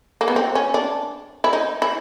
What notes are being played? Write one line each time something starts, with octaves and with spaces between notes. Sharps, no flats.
A#3
B3
C4
C#4
D4
E4
D#4
E4